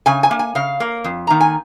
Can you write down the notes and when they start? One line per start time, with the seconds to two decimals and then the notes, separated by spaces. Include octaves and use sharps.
0.06 C#3 G#5
0.23 G#5
0.31 A#3
0.39 G#5
0.55 C#3 F5
0.80 A#3
1.04 F2
1.27 D#3 A#3 A#5
1.40 G#5